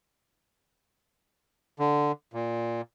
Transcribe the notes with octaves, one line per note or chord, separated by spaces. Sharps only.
D3
A#2